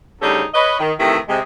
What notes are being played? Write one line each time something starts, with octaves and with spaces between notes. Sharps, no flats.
D2 C#3 G3 D#4 A4 C#5
B4 C#5 D#5
D#3
C3 D#3 E3 A3 E4 G4
C3 G#3